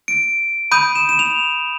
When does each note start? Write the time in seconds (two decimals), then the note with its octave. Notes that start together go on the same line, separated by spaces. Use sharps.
0.08 D7
0.71 B5 D#6 G6 D#7
0.95 E7
1.09 E7
1.19 F7